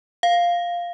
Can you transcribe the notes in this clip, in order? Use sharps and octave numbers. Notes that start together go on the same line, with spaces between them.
F5